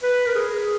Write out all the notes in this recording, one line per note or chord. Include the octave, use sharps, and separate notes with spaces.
B4
A#4
G#4